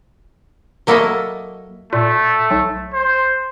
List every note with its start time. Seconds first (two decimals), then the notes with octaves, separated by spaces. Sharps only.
0.87 F#3 A#3 E4 A4 C#5 D#5
1.93 A#2 A3
2.51 B1
2.93 C5